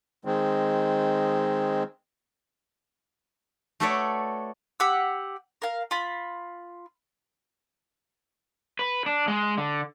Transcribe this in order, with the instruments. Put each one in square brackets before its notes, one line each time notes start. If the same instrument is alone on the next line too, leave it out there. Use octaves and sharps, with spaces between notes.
[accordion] D#3 G#3 C4
[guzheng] A3 F#4 A4 B4 C#5 D5
[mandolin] G4 F#5 E6
A#4 F5
F4 B5
[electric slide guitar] B4
D4
G#3
D3